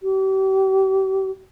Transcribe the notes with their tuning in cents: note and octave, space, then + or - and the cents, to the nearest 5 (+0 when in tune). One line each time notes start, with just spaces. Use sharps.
G4 -35